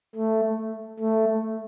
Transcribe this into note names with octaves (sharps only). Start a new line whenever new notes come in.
A3
A3